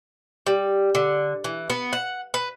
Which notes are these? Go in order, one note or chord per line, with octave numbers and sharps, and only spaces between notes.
G3
D3
E3
B3
F#5
B4